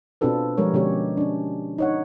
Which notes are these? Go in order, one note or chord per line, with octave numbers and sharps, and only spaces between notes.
B2 C4 D4 F4 A4 B4
F3 G3 G#3 A#4 C#5
B2 D3 G#3 C#4 G4 C#5
C#4 D4
D#4 C#5 F#5